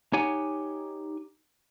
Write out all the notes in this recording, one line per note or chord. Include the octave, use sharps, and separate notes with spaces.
D#4 G4 C#5 F#5 G#5